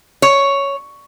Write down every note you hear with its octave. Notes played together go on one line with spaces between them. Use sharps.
C#5